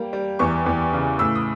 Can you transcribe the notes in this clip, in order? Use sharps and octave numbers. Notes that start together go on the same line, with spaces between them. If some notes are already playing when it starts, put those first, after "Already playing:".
Already playing: G3 A#3
G3
E2 C#6
E2
C#3
A2 E6
D#6